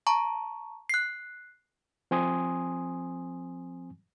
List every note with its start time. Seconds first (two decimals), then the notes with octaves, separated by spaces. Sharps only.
0.07 A5 A#5 C#6
0.89 F#6 C7
2.11 F3 C4 G#5 C6 D#6